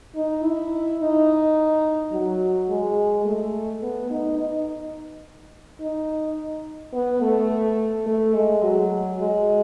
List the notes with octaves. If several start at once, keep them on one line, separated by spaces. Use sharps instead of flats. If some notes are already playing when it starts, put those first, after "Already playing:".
D#4
E4
D#4
F#3
G#3
A3
B3
D#4
D#4
D#4
B3
A3
A3
G#3
F#3
G#3